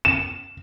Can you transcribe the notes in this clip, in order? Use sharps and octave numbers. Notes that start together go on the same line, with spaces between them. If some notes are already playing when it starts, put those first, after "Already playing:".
E7